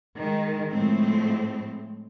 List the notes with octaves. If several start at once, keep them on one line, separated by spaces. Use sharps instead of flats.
D#3 G#3
A2 F3 G#3 A3 C4